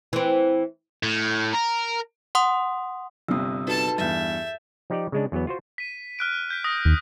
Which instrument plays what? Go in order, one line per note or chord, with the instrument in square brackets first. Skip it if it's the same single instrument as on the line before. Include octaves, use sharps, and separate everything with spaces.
[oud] E3 C4
[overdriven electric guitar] A2
A#4
[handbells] F#5 C6 D#6
[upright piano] G1 G2 C3 [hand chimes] D#6 E6
[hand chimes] D#4 F#4 B4 [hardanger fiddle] A4 A5
[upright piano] E2 G2 [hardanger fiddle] E5 [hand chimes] G6 A6
[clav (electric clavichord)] F3 D#4 G4 D5
C#3 G#3 D4
E2 F#3 B3
F4 F#4 C5
[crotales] B6 D#7
F6 F#6 D7
G6 B6
D#6 A#6
[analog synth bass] D#2